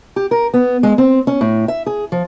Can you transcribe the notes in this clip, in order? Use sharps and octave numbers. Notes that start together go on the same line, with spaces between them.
G4
A#4
B3
G#3
C4
C#4
A2
E5
G#4
F3